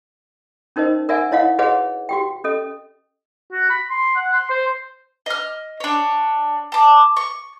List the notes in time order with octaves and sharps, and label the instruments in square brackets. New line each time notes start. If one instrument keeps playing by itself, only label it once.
[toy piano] C#4 D#4 A#4 C5 D#5
A#4 D5 E5 F#5 G#5
E4 C#5 D#5 F5 F#5
F#4 G#4 B4 C#5 D#5 F#5
F#4 G4 G5
C#4 A4 D#5
[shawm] F#4
B5
C6
F#5
C6
C5
[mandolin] D#5 F6
D4 C#5
A5 D6
C#6